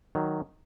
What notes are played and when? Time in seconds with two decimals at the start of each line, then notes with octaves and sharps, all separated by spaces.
0.15 D#3 F#3